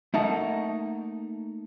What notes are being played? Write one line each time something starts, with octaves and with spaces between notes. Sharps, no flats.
A3 A#3 D#4 F#5 A5